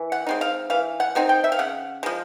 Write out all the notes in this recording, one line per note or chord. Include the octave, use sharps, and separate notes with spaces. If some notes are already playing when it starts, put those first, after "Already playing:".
Already playing: E3
F#5
G#3 C4 D#4
F5
E3 F5
F#5
G#3 C4 D#4
G5
E5
F5
C#3 F#5
F3 G#3